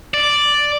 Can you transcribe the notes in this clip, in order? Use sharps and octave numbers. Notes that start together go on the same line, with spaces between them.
D5